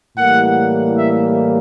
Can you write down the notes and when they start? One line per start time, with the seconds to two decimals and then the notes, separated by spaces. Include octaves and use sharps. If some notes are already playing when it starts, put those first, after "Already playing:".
0.17 A2 E3 G3 A#3 F#5
0.98 E5